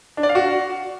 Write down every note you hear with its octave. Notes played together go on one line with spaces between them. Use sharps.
D4
D5
F5
F#4